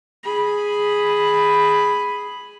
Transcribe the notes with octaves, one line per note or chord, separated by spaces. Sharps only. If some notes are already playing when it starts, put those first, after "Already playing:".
G#4 B5